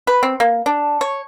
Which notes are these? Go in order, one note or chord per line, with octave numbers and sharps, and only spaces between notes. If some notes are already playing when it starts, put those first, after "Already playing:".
B4
C4
A#3
D4
C#5